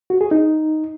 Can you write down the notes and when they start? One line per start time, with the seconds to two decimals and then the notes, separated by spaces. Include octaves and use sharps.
0.10 F#4
0.21 G#4
0.31 D#4